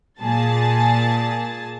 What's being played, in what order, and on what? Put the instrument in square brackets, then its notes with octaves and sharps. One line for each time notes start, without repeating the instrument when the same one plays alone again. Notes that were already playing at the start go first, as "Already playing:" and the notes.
[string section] A#2 G#4 A5 A6